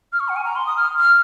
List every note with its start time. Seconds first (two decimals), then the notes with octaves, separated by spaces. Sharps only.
0.13 F6
0.20 C#6
0.29 F#5
0.36 G#5
0.44 A#5
0.56 C6
0.66 D#6
0.77 F6
0.99 F6